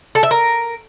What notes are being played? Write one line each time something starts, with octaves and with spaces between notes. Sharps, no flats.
A4
E5
A#4